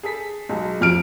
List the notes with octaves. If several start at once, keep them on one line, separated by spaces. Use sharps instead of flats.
G#4 A4 B6
B1 G#3
F2 F6 D7